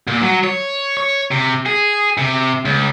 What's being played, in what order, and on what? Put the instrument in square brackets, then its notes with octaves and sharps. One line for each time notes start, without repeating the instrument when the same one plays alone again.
[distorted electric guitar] A#2
F#3
C#5
C#5
C3
G#4
C3
C#2